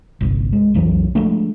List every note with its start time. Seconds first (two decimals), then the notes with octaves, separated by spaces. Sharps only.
0.21 G1 C2
0.52 G#3
0.74 B1 F2 E3 F#3
1.15 F3 G#3 A3 D4